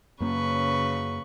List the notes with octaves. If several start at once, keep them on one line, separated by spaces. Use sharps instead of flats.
F#2 C#3 A#3 C#4 B4 C#6